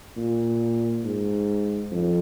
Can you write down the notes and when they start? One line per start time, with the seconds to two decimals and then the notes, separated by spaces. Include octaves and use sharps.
0.17 A#2
1.04 G#2
1.91 F2